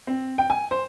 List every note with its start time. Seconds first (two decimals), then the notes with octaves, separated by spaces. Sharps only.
0.07 C4
0.38 G5
0.50 G#5
0.71 C5